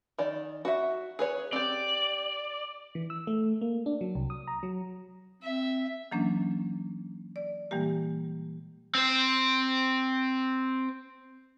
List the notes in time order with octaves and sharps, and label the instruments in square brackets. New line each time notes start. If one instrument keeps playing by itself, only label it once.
[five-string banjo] D#3 D5
F#4 E5
G#4 B4 C#5
[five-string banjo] C4 G4 [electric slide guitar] D5
[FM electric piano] E3
E6
A3
A#3
D4
F#3
C2
D#6
A#5
F#3
[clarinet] C4 [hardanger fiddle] E5
[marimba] E3 F#3 A#3 C#4 D4
D5
A#2 E3 G3 G#3 A#3 G4
[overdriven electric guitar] C4 C5